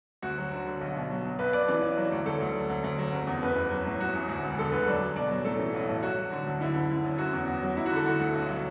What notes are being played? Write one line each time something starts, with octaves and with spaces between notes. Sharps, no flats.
D2 F#4
F#3
D3
D3
B1
B2
F#3
B1
B1 B4
B1 D5
E3 D5
B1
F#3
D2
D2 A4
D2
F#3
D2
D2
F#3
F#1
E2
F#1 B4
E2
F#3
A2
F#3 F#4
A1
D2
E1
D3 A4
D3 B4
F#3 D5
F#3
B2 D5
F#3
A2 A4
E3
B1
A2
F#3 F#4
F#3
D3
D2
D3 E4
F#1
D3
F#2
F#3 F#4
E2
E2
F#3
F#3 E4
F#4
D3 A4
D3 F#4
D2
B1
F#3